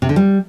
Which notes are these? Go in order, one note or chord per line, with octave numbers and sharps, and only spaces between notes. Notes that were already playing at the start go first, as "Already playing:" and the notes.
C3
D3
G3